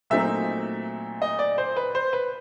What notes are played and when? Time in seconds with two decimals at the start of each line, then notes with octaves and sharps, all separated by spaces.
0.10 A#2 F#3 A3 C4 D#4 E5
1.22 D#5
1.39 D5
1.58 C5
1.76 B4
1.95 C5
2.13 B4